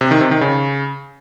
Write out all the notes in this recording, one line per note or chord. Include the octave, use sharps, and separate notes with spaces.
C3
D#3
C3
D#3
C#3